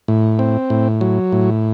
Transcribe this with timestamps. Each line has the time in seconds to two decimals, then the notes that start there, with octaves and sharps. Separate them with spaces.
0.08 A2
0.39 C4
0.70 A2
1.01 F#3
1.32 A2